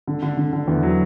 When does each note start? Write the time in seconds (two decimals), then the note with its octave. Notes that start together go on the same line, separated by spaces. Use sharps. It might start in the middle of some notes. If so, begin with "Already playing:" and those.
0.08 D3
0.23 D3
0.37 D3
0.53 D3
0.68 E2
0.83 F#3